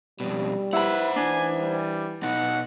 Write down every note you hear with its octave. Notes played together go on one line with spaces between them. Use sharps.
F2 B2 G3
E4 B4 C5 F#5 B5
E3 D4 G#5
G3
B2 D#4 F#5